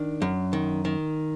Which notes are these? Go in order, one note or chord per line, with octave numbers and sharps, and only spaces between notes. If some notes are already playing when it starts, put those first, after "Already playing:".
Already playing: D#3 D4
F#2
D#3
D#3